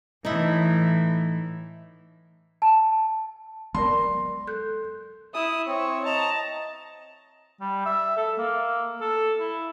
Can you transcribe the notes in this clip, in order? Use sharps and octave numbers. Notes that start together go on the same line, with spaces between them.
A2 E3 D#4 E4
A5
F#3 G#3 B3 A#4 D5 A5 C6
A4 F#6 G6
E4 D#6
C4 C#5
D#5 A5 A#5
G3
E5
A4
A#3
A4
E4